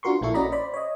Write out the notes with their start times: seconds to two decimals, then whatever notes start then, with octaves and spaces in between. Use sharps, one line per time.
0.03 D4 F4 F#4 A#4 C6 C#6
0.21 A#1 A#2 A#3 E4 A4 C#6
0.34 C#4 F#4 D5 D#5 A#5 B5
0.52 C5 D5 B5
0.74 C#5 D#5